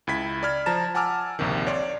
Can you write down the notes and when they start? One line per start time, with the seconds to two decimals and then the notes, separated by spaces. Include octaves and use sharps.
0.07 C#2 E4 B5 G#6 B6
0.43 D5 B5 F6 G#6
0.66 F3 A5 A#5 A6 E7
0.95 F#5 G#5 A5 D6 E6 F6
1.39 A#1 D#2 C3 D#3
1.67 C#5 D5 C6